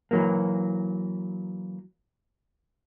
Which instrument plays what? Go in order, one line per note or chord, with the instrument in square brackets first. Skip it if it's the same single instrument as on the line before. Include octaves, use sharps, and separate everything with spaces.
[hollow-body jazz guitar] E3 F#3 A#3